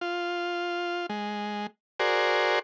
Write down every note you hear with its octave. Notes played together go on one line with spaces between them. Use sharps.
F4
G#3
F#4 G#4 A#4 C5 D5